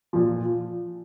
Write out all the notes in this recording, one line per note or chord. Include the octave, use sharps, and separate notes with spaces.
A#2 F3